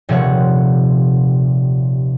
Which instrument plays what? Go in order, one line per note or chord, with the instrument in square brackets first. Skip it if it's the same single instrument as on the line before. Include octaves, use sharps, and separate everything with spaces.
[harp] D#1 C3 F3 C4 C#5 F#5